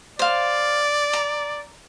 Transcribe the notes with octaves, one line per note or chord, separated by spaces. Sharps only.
C5 D5 F5
A#5